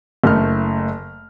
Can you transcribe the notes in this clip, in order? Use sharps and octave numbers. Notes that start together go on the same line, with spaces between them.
F#1 A3 F6